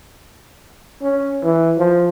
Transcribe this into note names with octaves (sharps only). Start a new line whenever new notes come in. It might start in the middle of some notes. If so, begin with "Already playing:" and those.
C#4
E3
F3